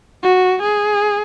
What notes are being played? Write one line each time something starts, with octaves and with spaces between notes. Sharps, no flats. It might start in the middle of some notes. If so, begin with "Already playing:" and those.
F#4
G#4